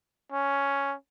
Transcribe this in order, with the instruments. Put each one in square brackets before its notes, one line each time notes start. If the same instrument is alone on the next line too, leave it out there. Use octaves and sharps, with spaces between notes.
[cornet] C#4